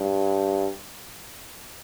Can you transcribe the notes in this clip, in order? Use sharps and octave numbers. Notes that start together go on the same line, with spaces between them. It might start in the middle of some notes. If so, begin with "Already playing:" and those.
Already playing: G2